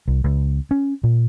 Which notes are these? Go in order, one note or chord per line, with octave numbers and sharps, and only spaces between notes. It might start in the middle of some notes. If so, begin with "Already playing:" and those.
C2
C#2
C#4
A#2